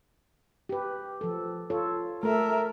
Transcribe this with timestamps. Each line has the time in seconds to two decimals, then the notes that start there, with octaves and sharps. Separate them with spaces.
0.69 G4 B4
1.21 F3 A4
1.70 F4 A4 C#5
2.23 A3 A4 A#4 E5